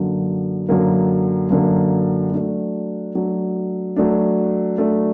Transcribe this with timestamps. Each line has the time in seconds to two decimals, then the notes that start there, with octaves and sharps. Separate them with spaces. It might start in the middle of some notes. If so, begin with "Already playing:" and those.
Already playing: F#2 D3 F#3 A#3
0.69 F#2 D3 F#3 A#3
1.51 F#2 D3 F#3 A#3
2.32 F#3 A3 D4
3.15 F#3 A3 D4
3.96 F#3 A3 D4
4.78 F#3 A3 D4